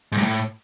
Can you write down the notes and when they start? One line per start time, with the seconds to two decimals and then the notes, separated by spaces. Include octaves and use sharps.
0.12 G#2
0.18 G2
0.23 A2